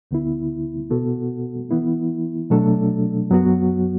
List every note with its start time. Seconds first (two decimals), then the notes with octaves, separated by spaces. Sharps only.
0.11 D2 D3 B3 E4
0.91 B2 B3 F#4 A4
1.71 E3 B3 E4
2.50 B2 F#3 A3 D4 A4
3.30 F#2 F#3 B3 F#4